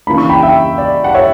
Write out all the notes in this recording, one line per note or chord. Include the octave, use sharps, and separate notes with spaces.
C#3 E3 A#3 D4 B5
C#6
G5 B5
E5 G5
D5
F#5
C#5 E5